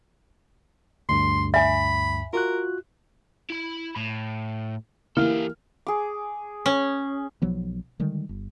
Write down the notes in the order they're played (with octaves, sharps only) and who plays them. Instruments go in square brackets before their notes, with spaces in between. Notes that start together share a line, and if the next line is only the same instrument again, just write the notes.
[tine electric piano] D2 G2 [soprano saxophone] C6
[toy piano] E5 G#5 [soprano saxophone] B5
[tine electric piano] F4 F#4 F#6 [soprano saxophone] A#4
[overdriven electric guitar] E4 B5
A2
[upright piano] E3 A#3 F6 [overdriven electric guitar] G4 A4
[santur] G#4 D6
[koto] C#4
[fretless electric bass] B1 F3 F#3 B3
D3 D#3 G3 G#3
G1